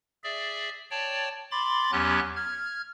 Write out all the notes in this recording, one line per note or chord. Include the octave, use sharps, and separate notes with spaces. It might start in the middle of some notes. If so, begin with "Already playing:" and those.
G#4 D5 E5
C#5 D5 G5 A5
B5 C6 D6 A6
E2 F#3 B3 C#4 G4 F#6
F6 G#6